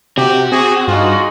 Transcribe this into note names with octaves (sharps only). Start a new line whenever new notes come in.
C3 F#4 G4
C4 G#4
G2 D#4 F4 G#4